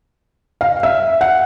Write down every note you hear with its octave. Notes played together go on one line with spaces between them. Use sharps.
F5
E5
F#5